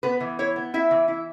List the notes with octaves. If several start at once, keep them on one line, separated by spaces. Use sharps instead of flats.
B3 B4
E3
E4 C#5
B3
E4 E5
E3
E4